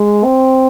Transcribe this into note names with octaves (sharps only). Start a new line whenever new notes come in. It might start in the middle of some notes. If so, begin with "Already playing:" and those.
Already playing: G#3
C4